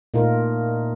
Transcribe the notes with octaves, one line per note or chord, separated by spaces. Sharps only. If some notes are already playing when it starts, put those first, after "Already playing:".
A#2 A3 D#4 F4 A#4